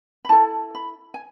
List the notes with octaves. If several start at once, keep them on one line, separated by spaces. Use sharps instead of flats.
B5
E4 A4 A5
B5
G#5